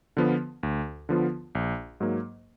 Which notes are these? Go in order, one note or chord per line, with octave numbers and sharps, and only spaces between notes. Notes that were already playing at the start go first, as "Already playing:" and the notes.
D3 F3 B3 F4
D2
D3 F3 B3 F4
A#1
G#2 F#3 A#3